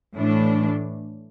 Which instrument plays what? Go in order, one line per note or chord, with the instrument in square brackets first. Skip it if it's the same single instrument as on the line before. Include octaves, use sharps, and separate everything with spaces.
[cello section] A2 E3 A3 D4